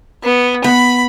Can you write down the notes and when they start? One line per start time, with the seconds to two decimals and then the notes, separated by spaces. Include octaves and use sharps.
0.24 B3
0.64 B3 B5